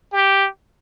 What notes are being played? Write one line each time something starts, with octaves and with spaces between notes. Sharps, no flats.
G4